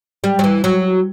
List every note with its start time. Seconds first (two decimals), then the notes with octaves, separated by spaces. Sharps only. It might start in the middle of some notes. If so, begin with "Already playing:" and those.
0.24 G3
0.39 F#3
0.44 E3
0.64 F#3